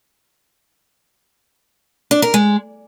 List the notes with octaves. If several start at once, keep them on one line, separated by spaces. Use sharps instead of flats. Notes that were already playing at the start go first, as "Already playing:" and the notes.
D4
A#4
G#3